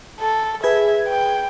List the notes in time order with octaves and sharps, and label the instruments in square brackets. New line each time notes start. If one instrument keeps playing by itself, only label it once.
[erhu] A4
[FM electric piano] G#4 B4 G#6 [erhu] E5
[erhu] G5